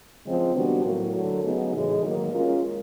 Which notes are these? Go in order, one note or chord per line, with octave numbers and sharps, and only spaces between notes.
C#3 F3 G#3 C4
D#3 G3 B3 D4 F#4
A2 F#3 A#3
D3 F#3 A3
C#3 F#3 B3 D#4 G#4
A2 E3 G#3
D#3 F#3 A#3
G#3 C#4 F4 A#4